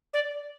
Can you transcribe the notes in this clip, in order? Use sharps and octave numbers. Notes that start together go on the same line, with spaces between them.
D5